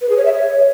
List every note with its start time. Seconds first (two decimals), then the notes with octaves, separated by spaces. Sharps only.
0.01 B4
0.09 G#4
0.17 C#5
0.25 E5
0.33 C#5